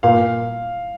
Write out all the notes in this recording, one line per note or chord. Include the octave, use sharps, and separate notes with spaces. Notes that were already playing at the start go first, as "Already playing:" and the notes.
A#2 F5